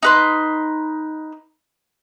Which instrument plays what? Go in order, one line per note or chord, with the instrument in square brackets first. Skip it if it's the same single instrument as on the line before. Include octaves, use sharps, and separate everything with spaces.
[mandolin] D#4 B4 C6